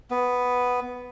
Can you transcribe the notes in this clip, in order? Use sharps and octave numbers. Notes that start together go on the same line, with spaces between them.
B3